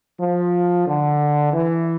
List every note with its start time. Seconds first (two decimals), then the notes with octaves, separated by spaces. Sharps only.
0.19 F3
0.86 D3
1.53 E3